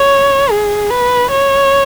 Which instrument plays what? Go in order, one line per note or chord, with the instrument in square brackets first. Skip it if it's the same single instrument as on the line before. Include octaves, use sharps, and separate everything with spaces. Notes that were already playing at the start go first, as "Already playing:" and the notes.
Already playing: [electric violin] C#5
G#4
B4
C#5